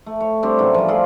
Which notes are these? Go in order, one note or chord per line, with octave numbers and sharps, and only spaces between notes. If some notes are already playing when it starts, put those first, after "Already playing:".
A3
C#5
G3 C4 D4 G4
A2 C#3 E3 F#3
F3 G3
F4 G#4 A4 D5